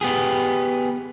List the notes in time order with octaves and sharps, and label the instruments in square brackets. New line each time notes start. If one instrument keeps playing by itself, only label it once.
[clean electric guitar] B3 G4 G#4